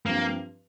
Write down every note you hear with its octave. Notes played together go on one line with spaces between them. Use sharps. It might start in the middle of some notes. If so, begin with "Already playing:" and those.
G2 F3 A#3 C4 G4